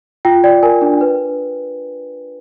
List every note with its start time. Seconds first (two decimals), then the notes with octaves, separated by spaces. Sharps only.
0.25 F4 G5
0.44 D5 G5
0.63 A#4 G#5
0.82 D4
1.01 B4